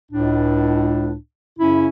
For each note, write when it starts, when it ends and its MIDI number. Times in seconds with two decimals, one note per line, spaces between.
0.12 1.13 37
0.12 1.13 45
0.12 1.13 62
1.59 1.87 42
1.59 1.87 49
1.59 1.87 61
1.59 1.87 64